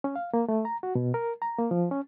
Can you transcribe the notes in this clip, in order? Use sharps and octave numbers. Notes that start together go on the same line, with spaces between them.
C#4
F5
A#3
A3
A#5
F#4
B2
A#4
A#5
A#3
F3
C#4